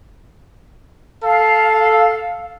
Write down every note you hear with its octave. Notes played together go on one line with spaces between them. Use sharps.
A4 F5